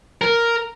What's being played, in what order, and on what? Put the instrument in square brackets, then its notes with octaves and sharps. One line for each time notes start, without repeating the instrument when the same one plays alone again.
[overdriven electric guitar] A#4